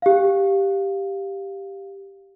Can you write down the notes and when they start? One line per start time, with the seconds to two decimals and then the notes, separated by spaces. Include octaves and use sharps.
0.02 G4 F5